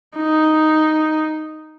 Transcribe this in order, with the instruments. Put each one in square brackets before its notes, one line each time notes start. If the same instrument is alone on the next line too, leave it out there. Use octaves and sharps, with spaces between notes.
[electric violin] D#4